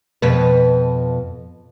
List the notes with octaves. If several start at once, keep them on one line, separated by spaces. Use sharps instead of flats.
F2 B2 B4